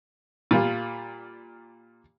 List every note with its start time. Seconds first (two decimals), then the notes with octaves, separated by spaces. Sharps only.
0.51 A#2 G3 F4